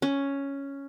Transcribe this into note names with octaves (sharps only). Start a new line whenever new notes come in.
C#4